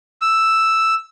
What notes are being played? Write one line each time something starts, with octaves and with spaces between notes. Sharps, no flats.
E6